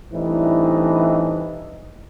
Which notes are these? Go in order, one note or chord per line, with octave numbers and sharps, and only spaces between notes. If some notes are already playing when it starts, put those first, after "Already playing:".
A2 E3 G3 C4 D4 D#4